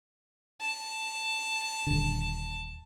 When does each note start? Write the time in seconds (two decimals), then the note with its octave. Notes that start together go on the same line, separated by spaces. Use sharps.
0.60 A5
1.87 D#1 D3